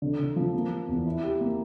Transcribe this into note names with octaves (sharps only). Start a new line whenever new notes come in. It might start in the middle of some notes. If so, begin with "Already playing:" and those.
D3
D3
F3
A#3
A#3
E2
E4
G4
A#3